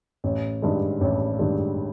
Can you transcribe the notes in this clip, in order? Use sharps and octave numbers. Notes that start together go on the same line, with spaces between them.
A1
G2 D#3 G#3
A1
G2 D#3 G#3